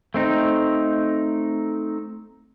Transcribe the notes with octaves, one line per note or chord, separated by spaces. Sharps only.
A3 C4 D#4